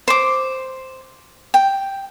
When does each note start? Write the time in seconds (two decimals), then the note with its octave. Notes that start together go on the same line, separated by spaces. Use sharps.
0.08 C5 D6
1.54 G5